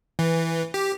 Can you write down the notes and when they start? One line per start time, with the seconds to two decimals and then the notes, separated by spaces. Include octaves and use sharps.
0.19 E3
0.74 G4